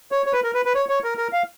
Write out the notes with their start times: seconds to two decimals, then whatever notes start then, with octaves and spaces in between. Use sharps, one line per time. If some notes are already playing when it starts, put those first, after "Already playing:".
0.12 C#5
0.26 C#5
0.33 B4
0.44 A#4
0.54 B4
0.65 B4
0.75 C#5
0.89 C#5
1.04 A#4
1.18 A#4
1.33 F5